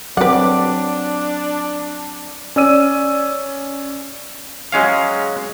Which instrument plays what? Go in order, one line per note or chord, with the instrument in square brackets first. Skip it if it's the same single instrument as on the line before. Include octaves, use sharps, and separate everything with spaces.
[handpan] F#3 C4 [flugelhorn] D4 [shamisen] B4 F#5 [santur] D5 D6
[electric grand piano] C#4 D5 E6 D#7
[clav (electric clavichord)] F#3 G#3 C#4 F5